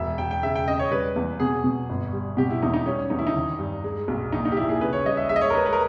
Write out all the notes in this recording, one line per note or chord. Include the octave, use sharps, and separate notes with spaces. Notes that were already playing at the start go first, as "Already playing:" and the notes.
Already playing: E1 E5
E1 G5
G5
C#3 E5
G5
C#3 D#5
C#5
G3 B4
E2
B2 G#4
B2
G1
G3
B2 G4
E4
E2 D#4
D#4
G3 C#4
E2 D#4
E4
D#4
D#3
G2
G#3
B1
A#1 D#4
D#4
G4
A#1 E4
G#4
C#3 B4
C#5
G3 D#5
E5
G#3 E5
D#5
C#5
A#4
G#3 B4
B4
A#4